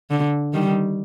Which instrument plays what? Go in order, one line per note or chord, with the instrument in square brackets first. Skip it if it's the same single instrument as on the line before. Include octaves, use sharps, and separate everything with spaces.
[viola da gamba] D3
D#3 G3